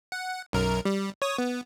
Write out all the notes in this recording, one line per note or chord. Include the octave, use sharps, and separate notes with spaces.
F#5
B1 F#2 A#4
G3
C#5 D#6
B3